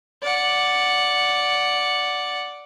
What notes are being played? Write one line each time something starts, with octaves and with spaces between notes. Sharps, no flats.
D5 F#5